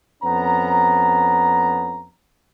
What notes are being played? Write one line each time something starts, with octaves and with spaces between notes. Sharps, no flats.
F2 B3 C#4 A#5